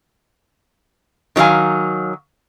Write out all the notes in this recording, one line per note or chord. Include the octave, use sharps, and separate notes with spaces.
D#3 F#3 C#4 F5 G#5